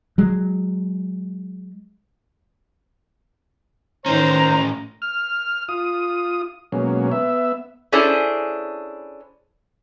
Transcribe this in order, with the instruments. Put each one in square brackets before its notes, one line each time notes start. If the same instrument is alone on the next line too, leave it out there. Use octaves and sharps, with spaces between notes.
[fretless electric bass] F#3 G#3
[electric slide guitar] A2 C#4 [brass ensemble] D#3 C5 [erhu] A#5
[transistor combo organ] F6
F4 D#6
B2 F#3 G#3 A#3 C#4
B3 E5
[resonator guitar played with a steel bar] C#4 D4 E4 G#4 A4 C5